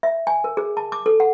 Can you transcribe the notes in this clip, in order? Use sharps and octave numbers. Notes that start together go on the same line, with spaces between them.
E5
G#5
A#4
G#4
A5
D6
A4
F#5